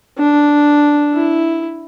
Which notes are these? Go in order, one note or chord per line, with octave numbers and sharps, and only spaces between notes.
D4
E4